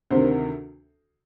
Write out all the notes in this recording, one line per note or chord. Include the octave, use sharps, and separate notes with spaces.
D2 C3 D#3 C5